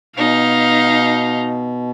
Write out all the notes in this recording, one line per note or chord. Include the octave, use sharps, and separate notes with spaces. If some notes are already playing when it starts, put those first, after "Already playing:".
B2 D#4 F5